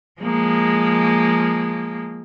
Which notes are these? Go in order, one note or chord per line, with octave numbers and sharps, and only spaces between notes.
F3 G#3 A#3